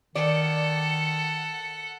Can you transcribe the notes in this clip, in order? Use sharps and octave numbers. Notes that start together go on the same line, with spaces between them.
D#3 A4 D5 F#5